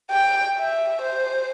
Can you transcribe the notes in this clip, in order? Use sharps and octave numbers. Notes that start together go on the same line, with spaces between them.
G5
E5
C5